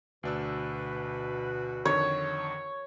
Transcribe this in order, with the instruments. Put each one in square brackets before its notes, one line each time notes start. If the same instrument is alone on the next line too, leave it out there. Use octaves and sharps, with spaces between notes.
[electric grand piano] D2 D4 E6 [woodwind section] B2 F#4 B4
[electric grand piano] F2 D3 D#3 [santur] C#5